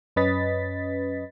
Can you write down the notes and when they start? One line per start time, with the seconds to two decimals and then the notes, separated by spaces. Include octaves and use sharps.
0.16 F#2 C#4 B4 D#5 A6 B6